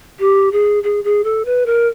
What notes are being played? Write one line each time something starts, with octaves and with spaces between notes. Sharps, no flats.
G4
G#4
G#4
G#4
A4
B4
A#4